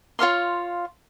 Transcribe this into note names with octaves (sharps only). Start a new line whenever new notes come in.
F4 C#5 F5 C6